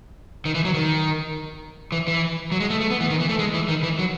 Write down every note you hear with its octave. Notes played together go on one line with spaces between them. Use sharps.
D#3
E3
F#3
D#3
E3
E3
F#3
G#3
A3
A3
B3
E3
D#3
E3
A3
G#3
E3
D#3
E3
F#3